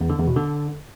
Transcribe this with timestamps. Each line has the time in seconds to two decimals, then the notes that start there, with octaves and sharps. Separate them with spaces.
0.01 E2
0.09 D3
0.18 E2
0.27 B2
0.36 D3